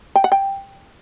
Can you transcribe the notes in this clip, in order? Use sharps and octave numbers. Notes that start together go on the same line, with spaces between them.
G5
F#5
G5